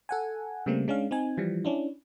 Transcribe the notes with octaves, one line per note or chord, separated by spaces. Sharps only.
A4 F#5 G#5
C#3 G3 A3 A#3 C4
G#3 C#4 D4 F5
C4 D#4 G#5
E3 F3 G3
C#4 D4 E4